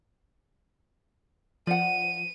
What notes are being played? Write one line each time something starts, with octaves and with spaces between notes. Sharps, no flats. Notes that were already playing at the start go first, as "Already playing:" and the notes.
F3 D5 F#5 D#7